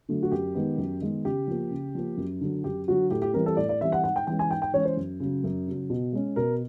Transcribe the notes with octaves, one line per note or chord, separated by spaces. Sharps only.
D3 F#3 A3
F#4
F#2 G4
D#3 G#3 B3
F#2
D#3 G#3 B3
C#3 G4
F3 A#3
C#3
F3 A#3
F#2
D3 F#3
F#2 G4
D3 F#3 F#4
A2 G4
G4
E3 G3 C4 A#4
A4
A2 D5
D5
E3 G3 C4 E5
F#5
G#2 F#5
G5
E3 G#3 C#4 G5
G#5
G#2 G5
G5
E3 G#3 C#4 C#5
C5
F#2
C#3 F#3
F#2
C#3 F#3
B2
G#3 C#4
B2 A#4